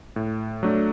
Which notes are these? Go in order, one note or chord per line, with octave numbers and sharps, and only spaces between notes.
A2
F#3 A3 D4